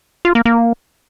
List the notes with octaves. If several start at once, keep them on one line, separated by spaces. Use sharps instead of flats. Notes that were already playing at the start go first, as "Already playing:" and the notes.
F4
A#3
A#3